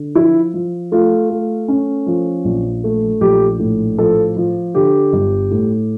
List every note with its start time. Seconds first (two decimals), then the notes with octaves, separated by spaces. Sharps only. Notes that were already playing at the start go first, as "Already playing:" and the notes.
Already playing: D3
0.15 F3 E4
0.54 F3
0.92 A3 F4
1.30 A3
1.68 C#4
2.06 F3
2.45 A#1
2.84 A3
3.21 A#1 G4
3.59 A2
3.98 F3 A4
4.37 F3
4.75 D3 G4
5.13 G1
5.51 A2